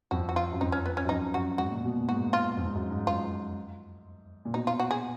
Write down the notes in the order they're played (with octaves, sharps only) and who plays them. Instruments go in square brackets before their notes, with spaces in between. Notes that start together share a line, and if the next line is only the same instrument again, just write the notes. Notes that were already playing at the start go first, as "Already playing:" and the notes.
[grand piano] F2 [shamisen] F#4
[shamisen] F#4
F4
[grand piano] F#2
[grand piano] F2 [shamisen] D#4
[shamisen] C#4
B3
C#4
[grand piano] F#2
[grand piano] F2 [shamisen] D#4
[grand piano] F#2 [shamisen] F#4
[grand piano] G#2 [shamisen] F#4
[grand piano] A#2
B2
A#2
[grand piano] G#2 [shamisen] F#4
[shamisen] F4
[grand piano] F2
G#2
F#2
G#2
[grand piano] G#2 [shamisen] F4
[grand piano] A#2
[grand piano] B2 [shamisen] D#4
[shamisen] F4
F#4
G#4